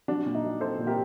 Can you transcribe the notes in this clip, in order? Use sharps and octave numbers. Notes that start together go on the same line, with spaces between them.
F#3 D4
A#2
D#4
F#3
C4 A4 C5
A#2
G4 A#4